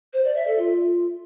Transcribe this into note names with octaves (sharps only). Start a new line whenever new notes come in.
C5
D5
E5
A4
F4